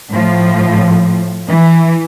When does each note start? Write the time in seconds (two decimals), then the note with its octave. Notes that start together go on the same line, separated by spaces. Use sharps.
0.11 A2 F3
1.48 E3